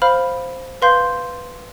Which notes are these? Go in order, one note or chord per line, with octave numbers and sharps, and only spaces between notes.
C5 F5 B5 F6
B4 F5 C6 G6